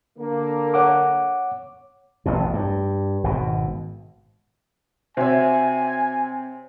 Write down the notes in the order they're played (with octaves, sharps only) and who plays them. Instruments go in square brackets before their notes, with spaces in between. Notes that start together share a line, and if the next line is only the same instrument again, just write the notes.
[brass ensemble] D3 A#3
[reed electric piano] C#5 F#5 D6
[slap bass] A1 F2 B2
G2
G#1 B2
[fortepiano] C3 [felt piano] F#4 E5 [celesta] C5 C#5 [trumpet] G#5